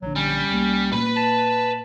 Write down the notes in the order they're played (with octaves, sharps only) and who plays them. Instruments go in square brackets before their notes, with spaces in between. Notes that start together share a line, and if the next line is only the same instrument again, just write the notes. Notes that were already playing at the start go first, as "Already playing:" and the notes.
[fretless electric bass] A#1 D3 [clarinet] F#3
[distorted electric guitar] G3 [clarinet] C#4
[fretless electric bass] C2 A#3
[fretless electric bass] A#2 A#3 [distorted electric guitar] B4 B5
[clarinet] A5